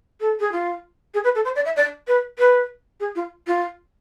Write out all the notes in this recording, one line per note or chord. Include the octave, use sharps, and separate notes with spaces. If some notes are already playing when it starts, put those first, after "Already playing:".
A4
G#4
F4
G#4
B4
A4
C5
D5
E5
D5
B4
B4
G#4
F4
F4